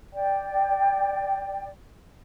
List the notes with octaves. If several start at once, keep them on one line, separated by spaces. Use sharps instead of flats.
D5 G5